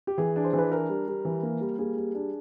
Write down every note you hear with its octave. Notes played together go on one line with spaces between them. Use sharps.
G4
E3 G#4
D4
C5
E3 B4
D4 A#4
G3
G3
E3
A#3
G3
A#3 G#4
G3
D4